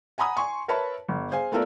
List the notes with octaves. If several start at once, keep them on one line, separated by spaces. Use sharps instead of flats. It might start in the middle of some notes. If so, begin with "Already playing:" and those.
F#5 G#5 A#5 B5 D#6
G#5 C6 C#6
A#4 B4 C#5 E5 A5 B5
G1
G#4 C5 F5 G#5
A3 B3 F4 A4 A#4 D5